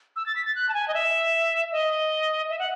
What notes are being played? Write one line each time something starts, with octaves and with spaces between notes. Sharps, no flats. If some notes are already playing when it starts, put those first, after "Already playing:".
E6
A6
B6
A6
F#6
A5
G#5
D#5
E5
D#5
E5
F#5